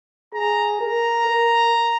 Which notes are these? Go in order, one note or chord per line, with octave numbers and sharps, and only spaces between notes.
G#4 A#5
A#4 A#5
A#4